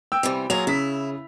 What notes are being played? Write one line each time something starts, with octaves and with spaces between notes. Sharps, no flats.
G5 E6
C3 E3 G3
F#3 A#3 F4 G#4 F7
C#3 E4 B6